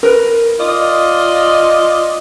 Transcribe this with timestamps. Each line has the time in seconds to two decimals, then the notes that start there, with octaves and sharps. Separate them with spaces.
0.03 A#4 B4
0.59 F4 D5 D#5